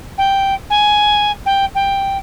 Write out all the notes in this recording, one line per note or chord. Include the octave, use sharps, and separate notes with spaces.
G5
G#5
G5
G5